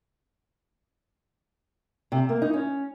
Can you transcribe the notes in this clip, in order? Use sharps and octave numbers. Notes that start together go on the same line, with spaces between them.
C3
A#3
D#4
C#4